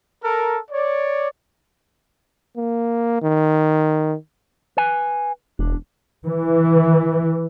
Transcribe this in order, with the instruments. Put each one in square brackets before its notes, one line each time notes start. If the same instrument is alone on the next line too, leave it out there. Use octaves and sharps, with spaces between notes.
[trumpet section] A4 A#4
C#5 D5
[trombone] A#3
D#3
[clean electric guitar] B4 G#5
[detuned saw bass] E1 [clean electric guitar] D4
[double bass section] E3